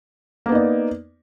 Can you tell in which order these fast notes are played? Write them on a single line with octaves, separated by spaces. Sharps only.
A#3 B3 D#4 D5